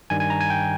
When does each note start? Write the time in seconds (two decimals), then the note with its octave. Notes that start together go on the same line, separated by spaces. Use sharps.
0.10 G2 D#3 G3 G#5
0.20 G#5
0.30 A#5
0.41 G#5
0.50 G5